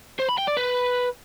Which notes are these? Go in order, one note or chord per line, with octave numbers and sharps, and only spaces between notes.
C5
B5
G5
D5
B4